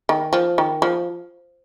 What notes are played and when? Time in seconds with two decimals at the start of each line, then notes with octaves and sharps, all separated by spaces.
0.09 D#3
0.33 F3
0.58 D#3
0.82 F3